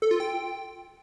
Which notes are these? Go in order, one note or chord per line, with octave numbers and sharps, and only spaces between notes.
A4
F4
G5